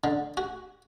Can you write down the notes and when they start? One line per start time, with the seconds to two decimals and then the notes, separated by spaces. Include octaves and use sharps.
0.04 D3
0.37 F#4